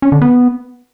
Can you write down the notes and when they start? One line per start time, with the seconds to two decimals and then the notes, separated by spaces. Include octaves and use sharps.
0.02 C#4
0.12 D3
0.22 B3